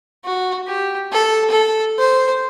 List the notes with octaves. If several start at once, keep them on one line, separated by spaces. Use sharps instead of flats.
F#4
G4
A4
A4
C5